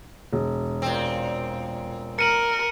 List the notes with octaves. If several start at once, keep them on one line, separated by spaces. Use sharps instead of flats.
E1
A#2 C4
A#4 C#7 D#7 F#7